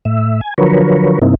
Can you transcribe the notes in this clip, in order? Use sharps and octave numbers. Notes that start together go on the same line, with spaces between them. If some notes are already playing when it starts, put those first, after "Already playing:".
A2 E5
G#5
D3 F3 F#3 A#4 B4 C#5
G2 C3 A#3 C4 D#4 E4